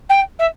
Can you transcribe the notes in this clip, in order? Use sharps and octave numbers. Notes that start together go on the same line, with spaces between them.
G5
E5